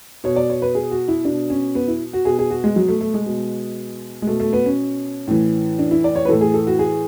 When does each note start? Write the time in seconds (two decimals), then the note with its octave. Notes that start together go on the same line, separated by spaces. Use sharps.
0.24 B2 C#5
0.36 D5
0.50 C#5
0.62 B4
0.75 G#4
0.91 F#4
1.08 E4
1.25 B2 D4
1.50 C#4
1.75 B3
1.88 E4
2.13 F#4
2.25 B2 G#4
2.39 G#4
2.51 F#4
2.64 G#3
2.76 F#3
2.88 A3
3.01 A3
3.14 G#3
3.26 B2
4.22 G#3
4.27 B2 A3
4.40 A3
4.53 B3
4.66 C#4
5.28 A2 E3
5.79 D4
5.91 E4
6.04 D5
6.16 C#5
6.25 B4
6.29 A2 E3 A4
6.41 G#4
6.54 A4
6.67 F#4
6.79 G#4